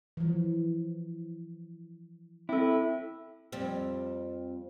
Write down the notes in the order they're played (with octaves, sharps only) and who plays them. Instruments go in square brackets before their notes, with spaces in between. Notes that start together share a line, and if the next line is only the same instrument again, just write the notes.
[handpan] E3 F3
[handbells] C4 A4 [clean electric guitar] E4
[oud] F2 G3 C4